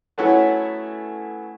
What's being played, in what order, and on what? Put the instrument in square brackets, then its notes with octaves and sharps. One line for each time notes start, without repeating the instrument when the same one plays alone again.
[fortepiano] F#3 A3 B3 C#4 E4 F#4